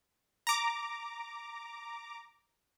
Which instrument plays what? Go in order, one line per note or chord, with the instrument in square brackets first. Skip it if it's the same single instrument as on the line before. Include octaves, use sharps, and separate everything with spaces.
[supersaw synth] A#5 D6